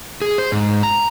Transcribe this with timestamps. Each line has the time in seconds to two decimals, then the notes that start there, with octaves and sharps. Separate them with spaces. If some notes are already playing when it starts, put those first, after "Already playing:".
0.22 G#4
0.38 C5
0.52 G#2
0.83 A#5